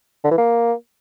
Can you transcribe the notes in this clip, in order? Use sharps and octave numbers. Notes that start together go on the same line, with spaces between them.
D3
E3
A#3